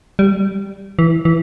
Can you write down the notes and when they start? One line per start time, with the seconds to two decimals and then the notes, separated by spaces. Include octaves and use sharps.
0.19 G3
0.99 E3
1.25 E3